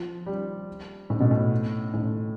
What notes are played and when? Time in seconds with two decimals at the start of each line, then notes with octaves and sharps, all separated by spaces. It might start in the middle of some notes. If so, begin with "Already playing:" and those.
Already playing: F3
0.26 G3
1.10 A2
1.20 B2
1.31 A2
1.94 A2